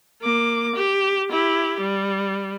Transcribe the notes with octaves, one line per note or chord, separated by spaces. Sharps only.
A#3 D6
G4
E4 G4
G3